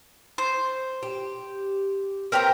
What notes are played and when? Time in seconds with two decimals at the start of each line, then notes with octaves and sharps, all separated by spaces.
0.38 C5
1.03 G4
2.32 C4 G4 A#4 B4 A#5